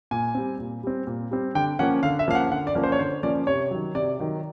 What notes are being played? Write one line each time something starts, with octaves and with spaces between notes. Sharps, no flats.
A#2 G#5
G3 C4
A#2
G3 C4
A#2
G3 C4
D3 G5
F3 A#3 C#4 F#5
D3 F5
E5
F3 A#3 C#4 F5
F#5
D3 F#5
D5
F3 A#3 C#4
C5
C#5
D3 C5
F3 A#3 C#4 D5
C3 C#5
D#3 F#3
C3 D5
D#3 F#3